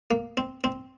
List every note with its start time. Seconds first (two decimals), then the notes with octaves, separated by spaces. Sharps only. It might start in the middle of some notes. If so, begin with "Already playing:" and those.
0.11 A#3
0.37 C4
0.64 C4